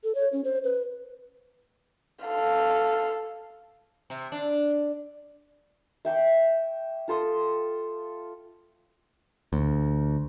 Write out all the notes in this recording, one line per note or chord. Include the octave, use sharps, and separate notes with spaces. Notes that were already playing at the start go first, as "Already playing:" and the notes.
A4
C#5
C#4
C5
B4
A4 F5
C3
D4
E5 G5 C#6 D6
F4 A4 C6 D#6
D2